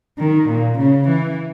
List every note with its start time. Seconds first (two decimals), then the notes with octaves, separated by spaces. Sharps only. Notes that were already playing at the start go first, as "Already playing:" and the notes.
0.19 D#3
0.49 A#2
0.78 C#3
1.08 E3